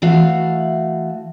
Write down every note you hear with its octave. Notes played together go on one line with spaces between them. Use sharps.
E3 A3 F#4 F5